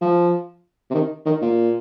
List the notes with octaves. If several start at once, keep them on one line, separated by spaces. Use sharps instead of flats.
F3
C3
D#3
D#3
A#2